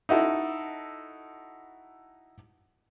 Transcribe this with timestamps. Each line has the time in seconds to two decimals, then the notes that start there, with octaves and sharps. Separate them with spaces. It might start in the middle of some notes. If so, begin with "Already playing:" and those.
0.09 D#4 E4 F#4 A4